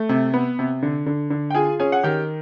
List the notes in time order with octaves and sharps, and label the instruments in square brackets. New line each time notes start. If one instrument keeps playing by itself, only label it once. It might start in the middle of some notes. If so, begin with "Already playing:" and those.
Already playing: [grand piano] A3
C3
B3
C3
D3
D3
D3
G5
F4 G#4 G#5
C#4 G#4 G#5
F#5
D#3 G4 G5